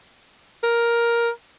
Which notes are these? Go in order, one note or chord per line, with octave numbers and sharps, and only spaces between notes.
A#4